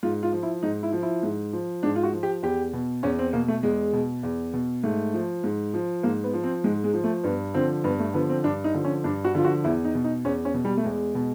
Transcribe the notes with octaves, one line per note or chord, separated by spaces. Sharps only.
G#2 F4
F4
F3
E4
G#2 D#4
E4
F3
E4
G#2
F3
G#2 D4
F4
F#4
F3
G4
E2 G4
B2
E2 C#4
C4
B2 A#3
A3
E2 G#3
B2
E2
B2
G#2 A3
F3
G#2
F3
G#2 A#3
B3
F3
C4
G#2 G#3
G#3
F3
A3
G2 B3
D3 F3 C4
G2 B3
A3
D3 F3 B3
C4
G2 D4
D#4
D3 F3
C#4
G2 D4
F#4
D3 F3 F4
F#4
E2 E4
D#4
B2
D#4
E2 C#4
C#4
B2
G3
A3
E2 G#3
B2